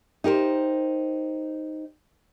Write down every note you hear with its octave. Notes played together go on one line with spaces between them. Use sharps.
D#4 G4 A#4 C5